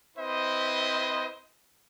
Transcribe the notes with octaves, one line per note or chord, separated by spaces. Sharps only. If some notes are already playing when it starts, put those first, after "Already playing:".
C4 E4 B4 C5 D#5